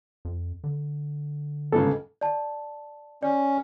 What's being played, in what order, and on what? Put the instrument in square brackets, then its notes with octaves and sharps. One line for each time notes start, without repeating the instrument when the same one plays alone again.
[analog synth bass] F2
D3
[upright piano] G1 G#2 C#3 [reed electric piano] A4
[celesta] D5 A5
[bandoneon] C#4 [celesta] D5